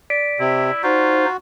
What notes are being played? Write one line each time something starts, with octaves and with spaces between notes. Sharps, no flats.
D5 B6 D7
C3 E4
D#4 F4 F#4 C5